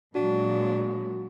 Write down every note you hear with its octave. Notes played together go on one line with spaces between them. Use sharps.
A#2 F#3 G#3 D4 F#4